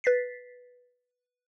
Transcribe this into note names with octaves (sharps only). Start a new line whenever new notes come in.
B4 A6 B6 C7